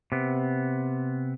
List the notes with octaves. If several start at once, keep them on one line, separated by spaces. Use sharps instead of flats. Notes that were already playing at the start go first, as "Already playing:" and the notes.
C3 B3